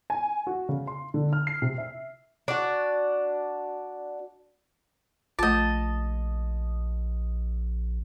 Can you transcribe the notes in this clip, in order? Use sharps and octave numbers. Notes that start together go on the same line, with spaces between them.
G#5
F#4
C#3
C6
D3
F6
C7
C3
E5
D4 F#4
A#1 A3 F4 D#5 A5